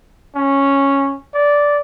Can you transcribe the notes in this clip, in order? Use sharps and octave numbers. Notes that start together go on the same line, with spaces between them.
C#4
D5